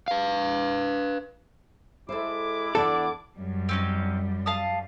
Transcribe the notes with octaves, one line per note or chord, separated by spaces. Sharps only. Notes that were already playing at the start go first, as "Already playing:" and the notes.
B4 F5
G#3 E4 A4 C5 D6
E2 D4 E4 A4 D5 F#5
F#2 G3
C4 C#4 D#4
F5 A5 D#6